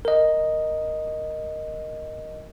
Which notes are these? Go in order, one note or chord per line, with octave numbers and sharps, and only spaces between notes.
A#4 D#5